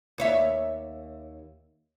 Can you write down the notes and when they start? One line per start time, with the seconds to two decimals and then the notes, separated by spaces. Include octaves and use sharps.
0.18 D#2 C#5 E5